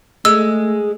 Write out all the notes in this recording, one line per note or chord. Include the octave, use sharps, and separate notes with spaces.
G#3 A3 E6